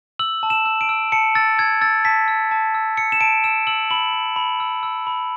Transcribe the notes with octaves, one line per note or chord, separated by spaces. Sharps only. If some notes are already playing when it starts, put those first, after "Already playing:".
E6 F#7
A5
E7
E6
D7
E6
A5 C#7
E6 A6
E6 G#6
E6 A6
A5 B6
E6
A5
E6
E6 C#7
E7
A5 D7
E6 E7
E6 F#7
B5 F#7
B5
B5
E6
E6
B5